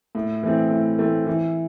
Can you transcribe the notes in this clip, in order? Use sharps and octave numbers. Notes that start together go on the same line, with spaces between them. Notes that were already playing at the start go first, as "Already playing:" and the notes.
A2
E3 A3 C4
A2
E3 A3 C4
E3